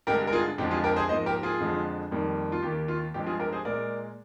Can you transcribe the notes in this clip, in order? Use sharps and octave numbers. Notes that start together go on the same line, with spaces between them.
G2 D3 G#3 G4 A#4
A#4
F4 G#4
F2 D3 F3 G#3 G4
F4 G#4
G4 A#4
G#4 C5
G#2 F3 A#3 C5 D#5
G4 A#4
F4 G#4
F2 D3 F3 G#3
F2 D#3 G3 A#3
F4
D#2 D#3 A#3 G4
F4
G2 F3 G#3 G4
F4 G#4
G4 A#4
G#4 C5
A#2 G#3 A#4 D5